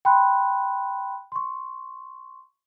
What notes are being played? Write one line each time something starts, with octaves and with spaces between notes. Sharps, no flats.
G5 B5 C6 F#6
C6 C#6